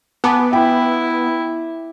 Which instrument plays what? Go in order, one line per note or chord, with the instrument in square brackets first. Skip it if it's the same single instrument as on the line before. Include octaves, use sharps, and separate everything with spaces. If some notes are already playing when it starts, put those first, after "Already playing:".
[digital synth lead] B3 [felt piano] G#5 A5 D6
[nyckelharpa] E4 [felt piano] G5